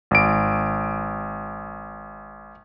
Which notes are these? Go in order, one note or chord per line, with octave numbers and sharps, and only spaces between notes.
G#1 D7